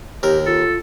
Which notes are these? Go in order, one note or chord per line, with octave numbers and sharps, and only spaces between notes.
D#2 G4 A#4
F4 A4